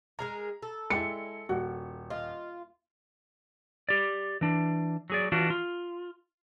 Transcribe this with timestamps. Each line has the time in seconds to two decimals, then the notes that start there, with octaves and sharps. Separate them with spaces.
0.19 G#3 G#4 A#4 A#5
0.62 A4
0.90 G#3 E4 D5 G5 C#7
1.49 D#1 F#4
2.10 F4 D#5
3.89 G4 D5
4.41 E3 D4
5.10 F#3 G#4 D5
5.32 E3 D4 F4 F#4
5.50 F4